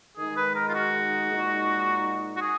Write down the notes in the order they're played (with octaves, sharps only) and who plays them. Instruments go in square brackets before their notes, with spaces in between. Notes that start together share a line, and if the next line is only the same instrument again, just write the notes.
[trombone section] D#3 G#3 D#4 [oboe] G#4
[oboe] B4
A#4
F4
F#4
[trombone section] A#2 G#3 D#4
[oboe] F#4
G#4